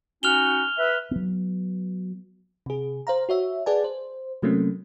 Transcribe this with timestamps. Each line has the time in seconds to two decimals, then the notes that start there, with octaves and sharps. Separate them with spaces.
0.23 C#4 D#4 F#4 F6 F7 G7
0.78 B4 E5
1.11 F#3 B3
2.66 C3 G#4
3.07 C5 F5 A#5
3.29 F#4 C#5 E5
3.66 G#4 B4 D5 F#5 G#5 A5
3.84 C5
4.42 C3 F#3 A3 A#3 C4 C#4